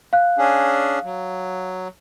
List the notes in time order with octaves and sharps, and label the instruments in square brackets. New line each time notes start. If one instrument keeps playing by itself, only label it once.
[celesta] F5 F#6
[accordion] C#4 D4 G#4
F#3